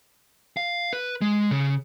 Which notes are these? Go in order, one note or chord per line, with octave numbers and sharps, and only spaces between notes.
F5
B4
G#3
C#3